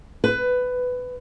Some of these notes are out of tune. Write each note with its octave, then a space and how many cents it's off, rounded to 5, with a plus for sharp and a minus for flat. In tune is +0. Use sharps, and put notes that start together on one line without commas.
B4 +15